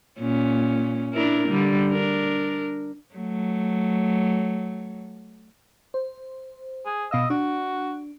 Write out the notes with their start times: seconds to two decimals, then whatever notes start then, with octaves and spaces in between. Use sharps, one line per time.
0.19 A#2 C#4
1.13 D4 E4 A#4
1.49 D3 G3
1.91 D4 A#4
3.15 F#3 A3
5.94 C5
6.85 G#4
7.11 B2 D#5 F5 E6
7.30 D4 F#4